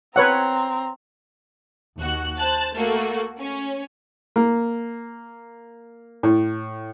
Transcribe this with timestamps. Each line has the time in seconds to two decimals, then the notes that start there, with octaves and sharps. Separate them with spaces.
0.16 C4 B4 C#5 F#5 A#5
1.99 D#2 F#4 F#6
2.38 C5 A5 F#6 A6
2.75 A3 A#3 F#4
3.38 C#4
4.36 A#3
6.23 A2